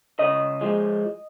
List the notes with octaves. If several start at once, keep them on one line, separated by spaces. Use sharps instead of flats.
C#3 D#5
F3 G#3